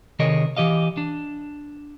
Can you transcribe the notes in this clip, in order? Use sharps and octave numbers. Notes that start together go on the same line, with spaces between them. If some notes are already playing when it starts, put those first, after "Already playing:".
C3 D#3 G#4 A#4 C#5 D#5
E3 G4 D#5 F5
D4